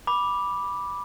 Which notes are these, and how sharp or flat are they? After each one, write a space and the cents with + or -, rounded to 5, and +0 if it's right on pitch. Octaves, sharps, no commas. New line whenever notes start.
B5 -10 D6 +0